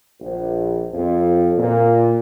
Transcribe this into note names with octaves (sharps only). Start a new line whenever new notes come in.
A#1
F2
A#2